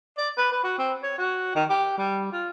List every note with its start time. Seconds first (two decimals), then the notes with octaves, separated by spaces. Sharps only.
0.18 D5
0.37 B4
0.52 B4
0.64 F#4
0.79 C4
1.03 C#5
1.18 F#4
1.55 D#3
1.70 G4
1.98 G3
2.32 F4